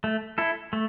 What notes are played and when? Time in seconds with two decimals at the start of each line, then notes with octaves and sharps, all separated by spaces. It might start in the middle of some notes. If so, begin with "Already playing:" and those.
0.04 A3
0.38 E4 A4
0.73 A3